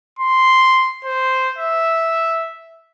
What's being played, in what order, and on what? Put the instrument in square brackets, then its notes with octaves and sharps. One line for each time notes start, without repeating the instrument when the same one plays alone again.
[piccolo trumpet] C6
C5
E5